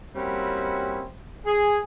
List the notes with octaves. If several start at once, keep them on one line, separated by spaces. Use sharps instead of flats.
G3 A#3 C4 C#4 E4 F#4
G#4